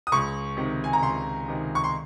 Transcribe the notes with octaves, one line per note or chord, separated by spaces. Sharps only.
D#6
C#2 C#6
C3 D#3
G#5
A#5
C#2 C6
C3 D#3
C#6
C6